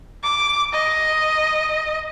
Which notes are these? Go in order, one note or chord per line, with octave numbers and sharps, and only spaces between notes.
D6
D#5